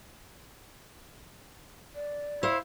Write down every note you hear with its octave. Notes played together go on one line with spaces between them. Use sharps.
D5
E4 C5 F5